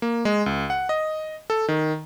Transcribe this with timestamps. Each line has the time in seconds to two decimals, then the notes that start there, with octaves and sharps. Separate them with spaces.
0.02 A#3
0.25 G#3
0.46 C#2
0.70 F#5
0.89 D#5
1.50 A4
1.68 D#3